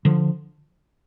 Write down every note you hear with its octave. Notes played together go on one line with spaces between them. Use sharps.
D3 F3